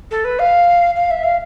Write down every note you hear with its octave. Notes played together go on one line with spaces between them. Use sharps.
A4
B4
F5
F5
E5
F5